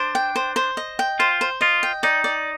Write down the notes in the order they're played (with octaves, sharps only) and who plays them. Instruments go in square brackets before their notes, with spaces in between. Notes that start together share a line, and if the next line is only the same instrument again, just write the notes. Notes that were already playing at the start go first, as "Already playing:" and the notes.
Already playing: [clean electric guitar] D4 [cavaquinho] C5
[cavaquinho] G5
C5
C5
D#5
G5
[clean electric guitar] F4 [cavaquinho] C5
[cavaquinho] C5
[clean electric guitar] F4 [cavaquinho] D#5
[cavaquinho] G5
[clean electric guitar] D#4 [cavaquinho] D5
[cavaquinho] D5